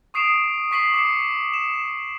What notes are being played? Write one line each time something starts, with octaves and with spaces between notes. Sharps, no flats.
C#6 D#6 C7 D7 E7 F7
C#6 B6 C7 F#7
D6 C7 C#7
E7